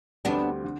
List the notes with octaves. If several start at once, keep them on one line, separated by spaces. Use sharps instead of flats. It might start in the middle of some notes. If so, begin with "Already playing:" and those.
D2 D3 G3 B3 C4 D4 G4
D3